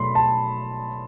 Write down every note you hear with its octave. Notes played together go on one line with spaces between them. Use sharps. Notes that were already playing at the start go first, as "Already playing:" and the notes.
Already playing: B2 F#3 A3 B5 C6
A5